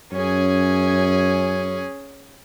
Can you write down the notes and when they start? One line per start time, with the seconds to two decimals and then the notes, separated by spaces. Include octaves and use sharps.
0.12 F#2 C#4 G#4